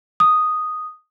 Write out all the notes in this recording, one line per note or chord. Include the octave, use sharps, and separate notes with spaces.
D#6